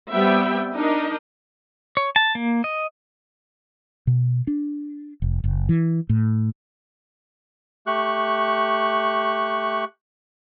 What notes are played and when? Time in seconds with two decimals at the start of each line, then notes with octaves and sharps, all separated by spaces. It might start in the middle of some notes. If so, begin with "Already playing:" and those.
0.12 G3 B3 C4 E5 G5
0.75 D4 D#4 A#4 D#5
1.97 C#5
2.16 A5
2.35 A#3
2.64 D#5
4.07 B2
4.47 D4
5.22 F1
5.44 F#1
5.69 E3
6.09 A2
7.87 A3 G4 C#6 F#6